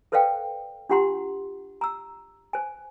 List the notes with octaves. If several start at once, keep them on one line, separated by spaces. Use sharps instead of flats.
A4 B4 C5 D5 F5 G5
D4 F4 G4 F#5 A#5 C6
A#5 E6
C5 G#5